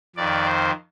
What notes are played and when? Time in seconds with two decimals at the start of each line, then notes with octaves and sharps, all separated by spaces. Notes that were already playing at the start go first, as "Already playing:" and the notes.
0.16 F2 D#3 D5
0.45 C5